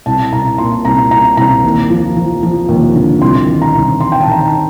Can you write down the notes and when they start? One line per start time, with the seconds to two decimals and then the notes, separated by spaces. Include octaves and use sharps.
0.06 C2 A5
0.33 C2 A#5
0.58 A#2 C6
0.85 C2 A#5
1.11 C2 A#5
1.37 C2 A#5
1.64 D#2
1.90 F3
2.17 F3
2.43 F3
2.69 D#2
2.96 D3
3.21 C2 C6
3.48 D#3
3.62 A#5
3.75 C2
4.00 D#3 C6
4.12 G5
4.20 A5
4.27 D#3 A#5
4.41 A5